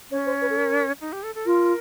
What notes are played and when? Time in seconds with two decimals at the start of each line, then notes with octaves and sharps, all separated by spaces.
0.11 C#4 C#5
0.26 C5
0.41 B4
0.50 A4
0.57 A#4
1.01 D#4
1.13 G4
1.23 A4
1.35 A4
1.46 F4 A#4